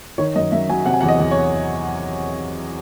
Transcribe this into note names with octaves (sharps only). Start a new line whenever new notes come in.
D#3 C#5
F#2 D#5
F#2 E5
F#3 G#5
C3 F#5
G#5
E2 F#5
D#5
E2
C#5